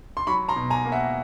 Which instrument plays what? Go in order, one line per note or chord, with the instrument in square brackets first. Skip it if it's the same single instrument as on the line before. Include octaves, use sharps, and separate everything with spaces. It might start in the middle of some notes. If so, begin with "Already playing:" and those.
[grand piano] C6
F#3 B5 C#6
A#5 C6
B2
G#5 A#5
A#3
E5 F#5